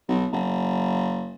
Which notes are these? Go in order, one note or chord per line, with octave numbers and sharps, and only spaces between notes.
B1
F#1